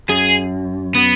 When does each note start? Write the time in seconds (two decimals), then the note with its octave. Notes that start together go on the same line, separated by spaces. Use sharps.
0.09 F#2 G#4
0.95 B3